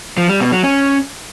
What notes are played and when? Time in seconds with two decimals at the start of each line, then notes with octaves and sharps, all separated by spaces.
0.17 F3
0.29 G3
0.40 B2
0.52 F#3
0.63 C#4